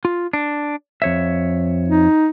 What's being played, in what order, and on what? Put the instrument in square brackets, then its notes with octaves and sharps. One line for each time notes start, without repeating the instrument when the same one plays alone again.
[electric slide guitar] F4
D4
F2 C#5 E5
[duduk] D#4